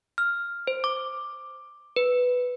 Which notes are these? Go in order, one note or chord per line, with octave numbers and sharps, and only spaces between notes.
F6
C5
D6
B4